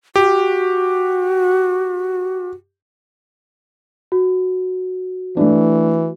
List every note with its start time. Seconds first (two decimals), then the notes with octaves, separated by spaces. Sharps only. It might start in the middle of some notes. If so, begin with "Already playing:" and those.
0.16 F#4 G4
4.12 F#4
5.37 E3 A3 D4